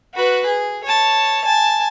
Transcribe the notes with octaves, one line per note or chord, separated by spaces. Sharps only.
F#4 B4
G#4
C#5 A5
G#5 A5